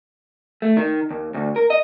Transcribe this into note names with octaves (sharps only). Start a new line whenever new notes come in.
A3
D#3
D#2
D2
A#4
D#5